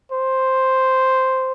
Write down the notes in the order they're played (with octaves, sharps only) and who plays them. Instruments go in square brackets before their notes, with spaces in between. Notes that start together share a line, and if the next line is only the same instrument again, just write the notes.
[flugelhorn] C5